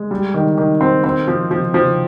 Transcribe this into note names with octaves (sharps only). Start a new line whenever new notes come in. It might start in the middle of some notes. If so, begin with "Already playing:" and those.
Already playing: G#3
G3
D#3
D#3
C4
C4
F3
F3
F3